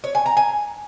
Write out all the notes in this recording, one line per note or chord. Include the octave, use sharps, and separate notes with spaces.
C#5
G#5
A#5
G#5